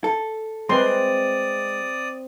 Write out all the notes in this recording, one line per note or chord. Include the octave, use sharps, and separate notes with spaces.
A4
G#3 C4 B4 D5 C6 D#6